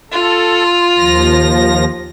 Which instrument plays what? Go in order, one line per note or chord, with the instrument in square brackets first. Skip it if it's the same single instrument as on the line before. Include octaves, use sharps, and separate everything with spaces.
[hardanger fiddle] F4 [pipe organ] A4
[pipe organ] D#2 F3 A#6